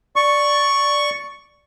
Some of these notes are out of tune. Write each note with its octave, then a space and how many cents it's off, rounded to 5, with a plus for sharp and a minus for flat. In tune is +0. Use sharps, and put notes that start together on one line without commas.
D5 -5 C#6 +0